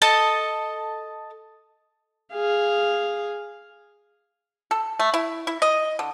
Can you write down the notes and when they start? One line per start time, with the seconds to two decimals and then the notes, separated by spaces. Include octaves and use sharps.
0.02 A4 D#5 A5
2.34 G#4 F5
4.71 A4
4.99 A3
5.14 E4
5.47 E4
5.62 D#5
5.99 D3